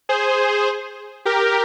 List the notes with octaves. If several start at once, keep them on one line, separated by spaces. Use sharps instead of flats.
G#4 C5
G4 A#4